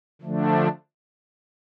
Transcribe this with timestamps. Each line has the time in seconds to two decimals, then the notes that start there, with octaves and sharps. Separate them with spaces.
0.22 D3 F3 A3 D4